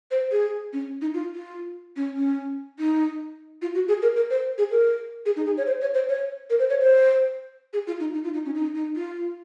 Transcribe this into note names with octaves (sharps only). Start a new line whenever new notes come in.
C5
G#4
C#4
D#4
F4
F4
C#4
C#4
D#4
F4
F#4
G#4
A#4
A#4
C5
G#4
A#4
G#4
D#4
G#4
C#5
C5
C#5
C5
C#5
A#4
C5
C#5
C5
G#4
F4
D#4
D#4
F4
D#4
C#4
D#4
D#4
F4